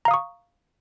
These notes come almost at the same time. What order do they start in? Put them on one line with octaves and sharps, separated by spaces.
A#5 F5 D#6 C#6